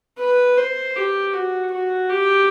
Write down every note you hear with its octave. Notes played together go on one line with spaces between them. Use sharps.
B4
C5
G4
F#4
F#4
G4